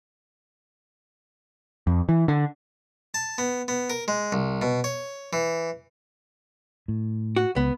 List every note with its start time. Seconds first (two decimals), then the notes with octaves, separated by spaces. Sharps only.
1.87 F2
2.09 E3
2.28 D3
3.14 A5
3.38 B3
3.68 B3
3.90 A#4
4.08 G#3
4.32 C2
4.62 B2
4.84 C#5
5.33 E3
6.88 A2
7.36 F#4
7.56 C#2 B3